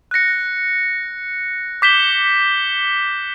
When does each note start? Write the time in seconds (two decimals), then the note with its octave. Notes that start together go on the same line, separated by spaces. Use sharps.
0.11 F#6 A#6 C#7
1.82 D6 G6 B6 E7 G7